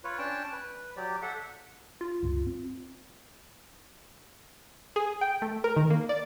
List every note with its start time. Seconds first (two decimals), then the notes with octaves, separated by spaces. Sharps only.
0.04 F4 B4 C#5
0.19 C#4 D4 G5 A5
0.52 B4
0.97 F#3 G4 D5
1.22 A4 E5 F#5
2.01 F4
2.23 C#2 G2
2.47 C4
4.96 G#4
5.21 G5
5.42 A3
5.64 A#4
5.76 D#3
5.90 A#3
6.09 D5